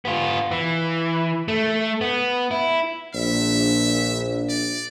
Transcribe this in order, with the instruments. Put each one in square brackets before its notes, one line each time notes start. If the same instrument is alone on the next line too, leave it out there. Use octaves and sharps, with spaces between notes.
[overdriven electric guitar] B3 F4
E3
A3
B3
E4
[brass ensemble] A#1 [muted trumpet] E5
[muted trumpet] D5